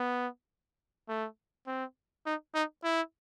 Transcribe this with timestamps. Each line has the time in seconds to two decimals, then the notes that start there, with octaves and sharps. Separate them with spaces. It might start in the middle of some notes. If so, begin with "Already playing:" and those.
Already playing: B3
1.09 A3
1.67 C4
2.26 D#4
2.55 D#4
2.84 E4